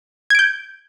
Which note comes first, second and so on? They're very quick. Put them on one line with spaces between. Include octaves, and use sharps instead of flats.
G#6 D7 G6